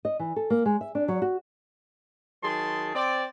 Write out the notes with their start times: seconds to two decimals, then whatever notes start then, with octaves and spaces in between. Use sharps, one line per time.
0.05 D#5
0.19 E3
0.36 A4
0.50 A#3
0.66 G#3
0.81 E5
0.95 D4
1.08 F#3
1.22 F#4
2.44 D#3 F#3 G#4 A5 C6
2.95 C4 D5